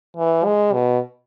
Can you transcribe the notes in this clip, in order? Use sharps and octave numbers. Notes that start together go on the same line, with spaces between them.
E3
G#3
B2